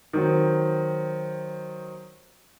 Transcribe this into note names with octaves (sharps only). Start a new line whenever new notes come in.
D#3 F#3 C4